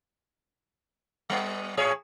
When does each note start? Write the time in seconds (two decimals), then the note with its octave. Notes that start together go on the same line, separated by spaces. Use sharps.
1.30 G3 B3
1.77 A2 G#4 C#5